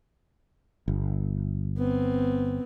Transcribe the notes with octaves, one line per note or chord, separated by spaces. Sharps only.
G1
B3 C4